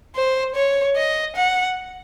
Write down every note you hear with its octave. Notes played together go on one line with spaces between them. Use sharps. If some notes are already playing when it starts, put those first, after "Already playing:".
C5
C#5
D#5
F#5